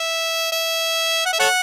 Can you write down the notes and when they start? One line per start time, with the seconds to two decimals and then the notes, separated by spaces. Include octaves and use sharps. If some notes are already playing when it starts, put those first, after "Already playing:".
Already playing: E5
0.52 E5
1.26 F#5
1.33 E5
1.40 A4 C#5 F#5